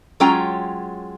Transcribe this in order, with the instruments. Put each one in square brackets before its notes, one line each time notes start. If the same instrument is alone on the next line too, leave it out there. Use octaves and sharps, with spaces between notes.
[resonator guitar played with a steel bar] F#3 G#3 C#4 F4 G5 A#5